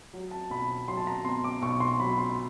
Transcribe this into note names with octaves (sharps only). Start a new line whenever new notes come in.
F#3
A5
B1 B5
F#3 C6
A5
A#5
B2 C6
D6
B1 C#6
C6
F#3 B5
C6